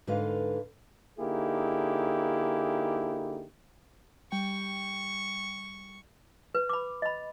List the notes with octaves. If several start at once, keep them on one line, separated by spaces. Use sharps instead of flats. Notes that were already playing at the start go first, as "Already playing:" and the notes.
G#2 D3 A#4 B4 F5
D3 A#3 D#4 E4 G4 G#4
G3 G5 C#6
B4
B5 D6
D#5 B5